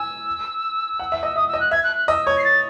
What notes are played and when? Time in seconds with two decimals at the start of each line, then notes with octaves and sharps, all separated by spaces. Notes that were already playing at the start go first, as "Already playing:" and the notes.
Already playing: G#5 E6
0.99 F#5
1.12 E5
1.23 D#5 E6
1.36 E5 D#6
1.48 E6
1.54 D#5
1.60 F#6
1.71 E5 G#6
1.83 F#6
1.96 F#6
2.08 D#5 E6
2.26 C#5 G#6
2.38 C7
2.44 A6